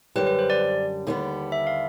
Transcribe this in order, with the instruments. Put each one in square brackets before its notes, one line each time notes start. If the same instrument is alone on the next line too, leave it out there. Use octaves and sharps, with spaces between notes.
[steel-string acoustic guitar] F#2 D3 G3 [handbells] B4
[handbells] B4
C5
D5
[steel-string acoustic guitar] D#2 D3 G3 B3
[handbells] E5
F5